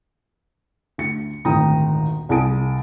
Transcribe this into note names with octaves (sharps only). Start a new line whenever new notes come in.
D2 C#7
D#1 G#1 D2 G5 A#5 D#6
C2 G#4 G#5 A5 D#6 D7